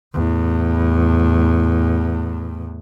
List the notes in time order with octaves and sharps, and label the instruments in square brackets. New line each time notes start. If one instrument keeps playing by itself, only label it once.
[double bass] E2 A2